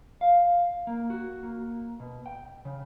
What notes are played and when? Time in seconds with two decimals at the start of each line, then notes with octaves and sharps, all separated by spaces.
0.21 F5
0.87 A#3
1.10 F#4
1.43 A#3
2.00 B2
2.26 G5
2.65 C#3